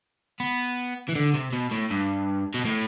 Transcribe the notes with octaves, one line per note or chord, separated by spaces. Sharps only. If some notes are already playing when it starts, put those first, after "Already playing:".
B3
E3
D3
C3
B2
A2
G2
B2
A2